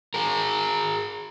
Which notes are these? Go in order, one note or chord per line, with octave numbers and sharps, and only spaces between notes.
G#4 A#4